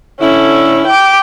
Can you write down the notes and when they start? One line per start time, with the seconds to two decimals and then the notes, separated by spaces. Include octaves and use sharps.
0.20 D3 C#4 E4
0.87 G5 D6